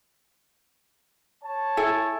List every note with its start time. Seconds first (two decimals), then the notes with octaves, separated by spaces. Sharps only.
1.43 C#5 A5
1.77 E4 A4 G#5